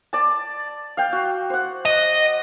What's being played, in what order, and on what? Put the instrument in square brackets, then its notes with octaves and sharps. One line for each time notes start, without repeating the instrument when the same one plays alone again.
[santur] D5 A5
F5 G5
F#4
C5 F#5
[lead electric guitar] D#5